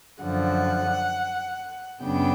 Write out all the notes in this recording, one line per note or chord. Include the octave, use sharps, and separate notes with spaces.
F#2 D3 F3 F#5
F#2 C#3 F#3 B3 D4 G5